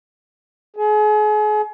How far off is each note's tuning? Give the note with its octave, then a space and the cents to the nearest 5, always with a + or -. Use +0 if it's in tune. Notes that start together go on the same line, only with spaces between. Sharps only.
G#4 +35